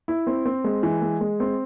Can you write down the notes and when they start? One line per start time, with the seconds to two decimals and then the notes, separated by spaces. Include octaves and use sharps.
0.08 E4
0.27 C4
0.46 C4
0.64 G#3
0.83 E3
1.02 G#3
1.21 G#3
1.40 C4